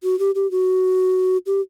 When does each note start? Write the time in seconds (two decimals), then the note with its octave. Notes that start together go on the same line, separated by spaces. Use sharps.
0.03 F#4
0.19 G4
0.35 G4
0.51 F#4
1.46 G4